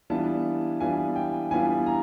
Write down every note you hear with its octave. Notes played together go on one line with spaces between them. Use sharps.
E3 G3 B3 D4 F4 A5
E3 G3 B3 D4 F4 G#5
G5
E3 G3 B3 D4 F4 G#5
A#5